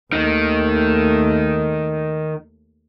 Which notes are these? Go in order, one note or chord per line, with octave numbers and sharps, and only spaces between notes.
D#2 D#3 A3